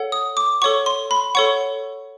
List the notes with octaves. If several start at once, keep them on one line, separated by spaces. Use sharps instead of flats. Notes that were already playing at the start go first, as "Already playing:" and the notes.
Already playing: A4 C#5 F#5
D#6
D6
A4 C#5 F#5 C#6
C6
B5
A4 C#5 F#5 C#6